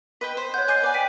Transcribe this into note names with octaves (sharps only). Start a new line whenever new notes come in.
B4 D#5 G5
C5
C#5 F#5 G6
D#5 G#5 D6 F#6 G6 C7
B4 D5 G#5
G5 B6 D#7